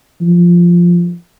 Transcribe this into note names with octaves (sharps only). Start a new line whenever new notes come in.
F3